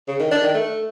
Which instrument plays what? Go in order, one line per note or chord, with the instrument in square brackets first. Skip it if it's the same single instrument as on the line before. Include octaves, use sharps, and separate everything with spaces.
[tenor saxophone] C#3
D#3
D4
D#3
A3